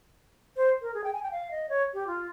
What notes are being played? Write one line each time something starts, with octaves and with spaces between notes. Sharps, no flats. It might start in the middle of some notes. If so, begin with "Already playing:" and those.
C5
A#4
G#4
G5
G#5
G5
F5
D#5
C#5
G4
F4